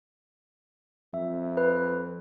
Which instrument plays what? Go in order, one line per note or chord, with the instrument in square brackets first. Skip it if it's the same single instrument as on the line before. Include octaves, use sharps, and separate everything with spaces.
[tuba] F2 [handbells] E5
[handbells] B4